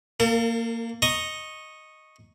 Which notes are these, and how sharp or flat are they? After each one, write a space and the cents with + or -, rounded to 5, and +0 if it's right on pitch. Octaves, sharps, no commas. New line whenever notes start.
A#3 -15 A#4 -45 A5 +30
D#5 +0 A#5 +0 C#6 -10